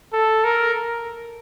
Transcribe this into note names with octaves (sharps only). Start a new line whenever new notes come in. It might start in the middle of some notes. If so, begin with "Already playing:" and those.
A4
A#4